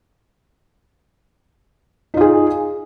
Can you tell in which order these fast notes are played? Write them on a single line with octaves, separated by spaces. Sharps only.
D#4 F4 G#4